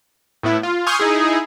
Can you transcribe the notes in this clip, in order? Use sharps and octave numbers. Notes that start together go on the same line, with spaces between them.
A2 B3 E4
F4
G#5 C6 C#6 D#6 F6 G6
D#4 E4 G#4